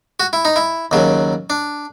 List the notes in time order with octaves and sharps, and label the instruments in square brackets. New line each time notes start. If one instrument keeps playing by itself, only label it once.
[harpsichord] F#4
E4
D#4
E4
D#2 C#3 F#3
D4